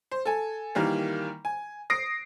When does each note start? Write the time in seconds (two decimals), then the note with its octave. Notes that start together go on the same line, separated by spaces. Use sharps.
0.11 C5
0.25 A4 G#5
0.75 D#3 E3 G3 A#3
1.45 G#5
1.90 D#6 A#6 C7 D7